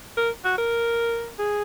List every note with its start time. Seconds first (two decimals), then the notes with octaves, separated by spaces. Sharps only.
0.17 A#4
0.45 F#4
0.58 A#4
1.39 G#4